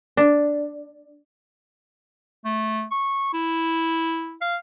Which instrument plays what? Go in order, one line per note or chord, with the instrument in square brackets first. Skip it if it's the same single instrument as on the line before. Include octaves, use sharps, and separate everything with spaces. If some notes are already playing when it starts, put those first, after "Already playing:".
[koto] D4
[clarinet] A3
C#6
E4
F5